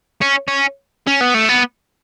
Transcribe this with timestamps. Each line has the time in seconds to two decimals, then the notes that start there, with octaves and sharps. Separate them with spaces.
0.21 C#4
0.48 C#4
1.07 C#4
1.21 B3
1.34 A3
1.49 B3